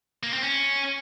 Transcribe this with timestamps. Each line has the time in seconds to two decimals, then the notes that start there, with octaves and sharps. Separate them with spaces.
0.23 A#3
0.33 C4
0.43 C#4